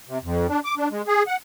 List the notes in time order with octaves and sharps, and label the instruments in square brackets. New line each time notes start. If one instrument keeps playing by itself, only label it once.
[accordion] C3
F2
D4
D6
D4
G#3
G#4
F#5